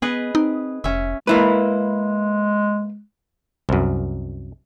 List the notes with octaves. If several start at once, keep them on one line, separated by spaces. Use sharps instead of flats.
B3 G#4 B4 D#5
C4 D#4
F1 C#4 E5
G#3 A#3 E4 B4
C2 F#2